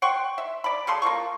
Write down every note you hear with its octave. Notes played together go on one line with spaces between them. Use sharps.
F#5 G5 C6 C#6
E5
D5 B5
C#3 G#4 A4 C6
A#3 F4 A4 C#6